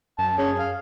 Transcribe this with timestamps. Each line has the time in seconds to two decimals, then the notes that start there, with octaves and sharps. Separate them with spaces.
0.19 F#2 A5
0.38 C#4 G#4
0.59 F5